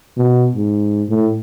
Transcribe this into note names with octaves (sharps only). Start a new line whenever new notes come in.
B2
G#2
A2